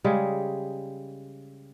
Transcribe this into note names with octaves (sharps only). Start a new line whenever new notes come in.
C#3 G3 G#3